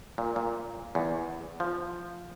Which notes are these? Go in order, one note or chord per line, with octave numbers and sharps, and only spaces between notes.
A#2
A#2
E2
F3